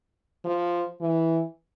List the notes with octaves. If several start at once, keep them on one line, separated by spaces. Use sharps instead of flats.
F3
E3